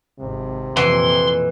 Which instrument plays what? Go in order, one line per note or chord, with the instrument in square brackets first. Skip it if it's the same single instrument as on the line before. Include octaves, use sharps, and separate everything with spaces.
[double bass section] G#1 [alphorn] C3
[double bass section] F2 A#2 [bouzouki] E3 [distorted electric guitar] C6